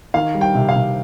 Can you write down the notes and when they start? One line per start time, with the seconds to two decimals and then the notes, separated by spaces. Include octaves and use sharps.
0.14 D#3 F5
0.34 G3
0.41 G5
0.55 C3
0.69 F5
0.76 C3